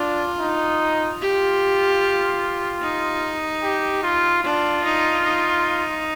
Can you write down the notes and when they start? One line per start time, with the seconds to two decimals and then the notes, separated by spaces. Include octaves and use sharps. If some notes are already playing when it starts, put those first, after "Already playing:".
Already playing: D4 F4
0.40 D#4
1.21 F4 G4
2.82 D#4
3.63 G4
4.03 F4
4.43 D4 F4
4.84 D#4
5.24 D#4